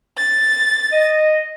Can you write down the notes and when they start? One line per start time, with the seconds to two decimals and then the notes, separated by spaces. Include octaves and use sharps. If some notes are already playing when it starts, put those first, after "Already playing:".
0.17 A6
0.93 D#5